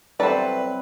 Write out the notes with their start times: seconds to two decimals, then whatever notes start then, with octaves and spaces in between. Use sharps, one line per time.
0.20 C3 F#3 G3 A4 B4 C5 D5